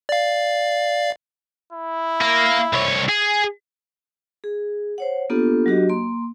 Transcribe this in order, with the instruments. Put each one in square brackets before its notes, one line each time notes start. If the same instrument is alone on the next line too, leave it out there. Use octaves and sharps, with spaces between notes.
[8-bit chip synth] D5 F5
[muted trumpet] E4
[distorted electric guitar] A#3
C2 C#5
G#4
[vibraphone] G#4
C5 C#5 F#5
A#3 B3 D4 F4 G4 A4
F#3 D4 F#4 G4 D#5
A#3 C6